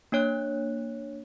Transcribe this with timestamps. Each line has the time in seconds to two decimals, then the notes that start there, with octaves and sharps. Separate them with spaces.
0.12 A#3 D4 C#5 F#6